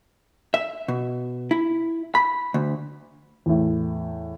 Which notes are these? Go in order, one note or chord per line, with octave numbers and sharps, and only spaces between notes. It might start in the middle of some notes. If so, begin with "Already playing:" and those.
E5
B2
E4
B5
D2
E2 A2